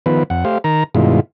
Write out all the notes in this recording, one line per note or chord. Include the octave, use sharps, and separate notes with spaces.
D#3 F3 B3 B4
F2 F#5
A3 G4 C5 F5
D#3 A#4 A#5
G2 B2 D#3 G#3 E4 F4